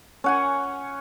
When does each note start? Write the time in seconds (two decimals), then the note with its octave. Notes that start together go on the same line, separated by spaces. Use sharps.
0.24 C#4 F#5 G#5